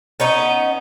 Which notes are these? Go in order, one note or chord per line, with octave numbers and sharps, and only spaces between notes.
B3 C#4 D#4